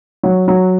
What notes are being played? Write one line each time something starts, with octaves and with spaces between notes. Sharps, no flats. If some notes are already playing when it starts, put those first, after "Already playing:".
F#3
F#3